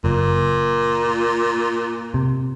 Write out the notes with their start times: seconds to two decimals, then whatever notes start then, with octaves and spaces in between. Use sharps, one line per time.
0.04 F#1 A#2
2.14 C3